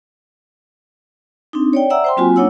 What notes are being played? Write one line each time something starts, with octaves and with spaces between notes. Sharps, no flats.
C4 D4 D#4
C#5 D5 G5
D5 E5 F#5 A#5 E6
C5 G5 C6
F#3 A#3 C4 F4 F#4 G#5
A#3 D4 D#4 C#5 F#5 E6